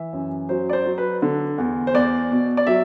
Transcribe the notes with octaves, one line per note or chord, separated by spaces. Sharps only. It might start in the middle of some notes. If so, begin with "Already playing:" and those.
Already playing: E3 E5
F#2
F#3 C5
D5
C5
F#3
B4
D3
E2
C5
E2 D5
B2
D5
F#3 E5